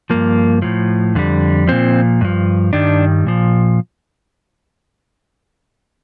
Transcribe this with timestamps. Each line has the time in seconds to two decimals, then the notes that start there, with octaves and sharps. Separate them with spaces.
0.10 G2 F3 A#3
0.62 A2 F3
1.15 F2 D3 G3
1.67 A#2 F3 C4
2.21 G2 F3
2.73 G2 D#3 G3 D4
3.27 A#2 F3